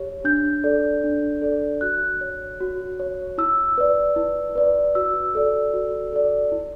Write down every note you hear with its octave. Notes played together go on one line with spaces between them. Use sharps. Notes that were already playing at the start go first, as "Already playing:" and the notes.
Already playing: G4 C#5
D4 G6
A4 D5
D4
A4 D5
F#4 F#6
C#5
F#4
C#5
E4 E6
B4 D5
E4
B4 D5
F#4 E6
A4 D5
F#4
A4 D5
E4